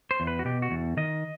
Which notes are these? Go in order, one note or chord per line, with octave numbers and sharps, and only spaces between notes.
C5
E2
B4
F#4
B2 G4
F#4
E2
D#3 D#5